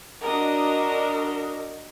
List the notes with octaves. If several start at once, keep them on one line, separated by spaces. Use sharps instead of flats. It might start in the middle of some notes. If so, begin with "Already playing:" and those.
D4 F#4 A#4 D#5